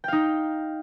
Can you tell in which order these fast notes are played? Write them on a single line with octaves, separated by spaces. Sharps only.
G5 F5 D#4